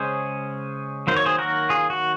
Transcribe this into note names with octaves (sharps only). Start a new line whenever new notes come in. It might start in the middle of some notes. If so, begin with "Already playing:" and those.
Already playing: C#3 G#3 C#4 G#4 C5
D#3 F#3 A#3 C5
C#5
G#4 C5
F#4 A#4
F4 G#4
F#4